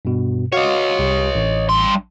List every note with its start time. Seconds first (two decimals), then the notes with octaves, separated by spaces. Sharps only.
0.05 G2 B2
0.53 F#4 C#5 D#5 F5
0.99 C2 G4
1.35 A1
1.69 G2 C6